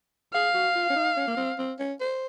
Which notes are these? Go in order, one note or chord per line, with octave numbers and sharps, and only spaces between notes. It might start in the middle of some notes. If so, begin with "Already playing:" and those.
G#4 F5
F#4
F4
C#4
D#4
C#4
A#3
C4
C4
C#4
C5